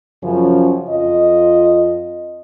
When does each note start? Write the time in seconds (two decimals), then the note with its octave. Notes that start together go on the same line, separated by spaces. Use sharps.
0.23 F#2 C#3 F3 C#4
0.90 F2 F4 D#5